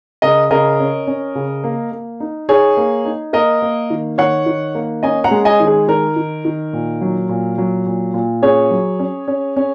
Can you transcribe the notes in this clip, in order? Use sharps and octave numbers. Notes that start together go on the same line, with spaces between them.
C#3 A#4 D#5
C#3 A#4 D#5
C#4
C#4
C#3
A#3
A#3
D#4
D#4 G#4 C#5
A#3
D#4
A#3 A#4 D#5
A#3
D#3
D#3 C#5 F#5
D#3
A#3
C#4 D#5 G#5
F#5 A#5
G#3
D#5 G#5
D#3
G#4
D#3 A#4
D#3
D#3
A#2
F#3
A#2
F#3
A#2
A#2
C#4 G#4 C#5
F#3
C#4
C#4
C#4